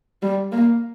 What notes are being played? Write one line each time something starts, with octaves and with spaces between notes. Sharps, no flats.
G3
A#3